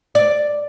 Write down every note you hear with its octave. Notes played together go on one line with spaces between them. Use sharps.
D5